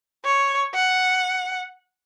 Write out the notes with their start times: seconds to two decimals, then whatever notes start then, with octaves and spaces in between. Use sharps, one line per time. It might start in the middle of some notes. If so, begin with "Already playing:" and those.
0.25 C#5
0.74 F#5